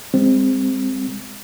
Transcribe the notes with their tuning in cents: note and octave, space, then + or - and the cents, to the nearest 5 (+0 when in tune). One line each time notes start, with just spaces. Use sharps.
G#3 -35 C4 +0